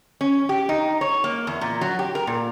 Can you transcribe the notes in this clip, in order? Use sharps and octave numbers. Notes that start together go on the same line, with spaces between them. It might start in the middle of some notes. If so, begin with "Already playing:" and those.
C#4
G4
D#4
C#5
A#3
E2
A#2
F#3
G4
A#4
A#2